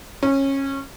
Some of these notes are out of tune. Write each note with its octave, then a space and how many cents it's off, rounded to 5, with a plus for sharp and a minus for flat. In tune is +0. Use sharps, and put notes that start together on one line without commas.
C#4 -20